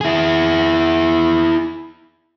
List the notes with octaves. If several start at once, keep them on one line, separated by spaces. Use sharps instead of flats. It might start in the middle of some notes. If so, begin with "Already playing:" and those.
E4 G#4